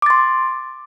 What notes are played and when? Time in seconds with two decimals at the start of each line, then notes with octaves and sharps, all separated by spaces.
0.02 D6
0.06 A6
0.10 C6